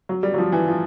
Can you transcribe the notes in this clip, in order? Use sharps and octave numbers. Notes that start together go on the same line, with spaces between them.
F#3
G3
F#3
F3
E3
F3